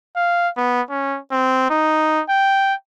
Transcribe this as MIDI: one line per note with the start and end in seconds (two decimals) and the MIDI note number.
0.16 0.49 77
0.57 0.81 59
0.90 1.18 61
1.32 1.69 60
1.70 2.22 63
2.29 2.74 79